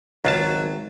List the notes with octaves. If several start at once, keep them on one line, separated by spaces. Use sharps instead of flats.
G#1 C#2 F#3 F4 A5